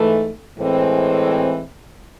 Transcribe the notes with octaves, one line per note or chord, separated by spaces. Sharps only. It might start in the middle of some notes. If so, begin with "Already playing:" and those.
Already playing: G#2 E3 A3
A2 E3 G#3 C4